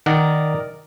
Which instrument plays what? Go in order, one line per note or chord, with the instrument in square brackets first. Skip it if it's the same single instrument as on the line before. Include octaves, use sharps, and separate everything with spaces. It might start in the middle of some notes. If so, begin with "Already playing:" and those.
[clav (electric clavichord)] D#3 F#5 [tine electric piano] A#4 D5 D#5